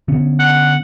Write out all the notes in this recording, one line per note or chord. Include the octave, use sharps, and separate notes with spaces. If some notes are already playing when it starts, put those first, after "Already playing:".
D3 B3 C#4
F#5